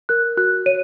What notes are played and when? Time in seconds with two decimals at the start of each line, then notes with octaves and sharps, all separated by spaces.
0.09 A#4 F#6
0.37 F#4 F#6
0.66 C#5 D#7